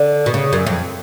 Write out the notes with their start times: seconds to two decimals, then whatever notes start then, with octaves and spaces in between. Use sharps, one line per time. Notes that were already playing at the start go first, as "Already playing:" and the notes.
Already playing: D3
0.26 B2
0.34 C#3
0.53 F#2
0.67 F2